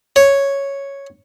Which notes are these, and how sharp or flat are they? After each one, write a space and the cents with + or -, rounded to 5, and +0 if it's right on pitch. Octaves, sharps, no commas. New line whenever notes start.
C#5 +0